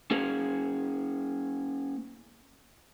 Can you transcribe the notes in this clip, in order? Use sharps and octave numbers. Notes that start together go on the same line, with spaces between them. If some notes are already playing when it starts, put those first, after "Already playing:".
A#3 C#4 G#4